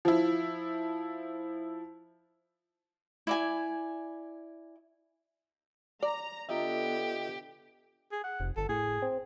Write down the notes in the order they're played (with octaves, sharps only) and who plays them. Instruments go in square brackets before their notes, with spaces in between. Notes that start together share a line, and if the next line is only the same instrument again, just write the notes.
[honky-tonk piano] F3 E4
[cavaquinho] E4 D5 G#5
[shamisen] D5 [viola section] A#5
[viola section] D3 B3 [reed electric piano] F4 D#5 E5 [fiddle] G4
[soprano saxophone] G#4
F#5
[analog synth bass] F1
[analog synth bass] G1 [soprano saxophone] A4
[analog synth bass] A2 [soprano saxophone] G#4
[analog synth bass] C4